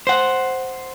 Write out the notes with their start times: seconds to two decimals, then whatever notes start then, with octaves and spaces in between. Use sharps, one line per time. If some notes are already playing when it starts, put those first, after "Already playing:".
0.07 C5 F#5